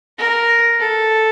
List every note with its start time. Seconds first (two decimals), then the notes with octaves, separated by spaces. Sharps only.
0.18 A#4
0.80 A4